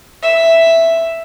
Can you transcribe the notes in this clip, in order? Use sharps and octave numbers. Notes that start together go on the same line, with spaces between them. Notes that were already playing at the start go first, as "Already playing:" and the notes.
E5